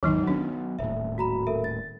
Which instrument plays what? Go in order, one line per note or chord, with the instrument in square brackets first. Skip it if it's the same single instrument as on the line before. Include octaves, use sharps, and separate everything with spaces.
[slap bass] G#1 E2 [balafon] D#3 F#3 D#4
[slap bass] F#3 B3 C#4 [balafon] D4
[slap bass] D#1 A2 [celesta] E5
[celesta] F#4 A#5 B5
A4 A#4 E5
A6